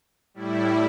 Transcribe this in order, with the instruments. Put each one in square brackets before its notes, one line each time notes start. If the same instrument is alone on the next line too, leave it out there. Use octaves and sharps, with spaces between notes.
[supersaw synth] A2 G3 E4